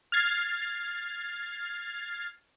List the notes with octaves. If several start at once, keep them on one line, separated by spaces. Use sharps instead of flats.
F6 G#6 A6 C7